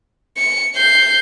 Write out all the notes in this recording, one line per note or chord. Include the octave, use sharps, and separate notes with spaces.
C#7
G6 C7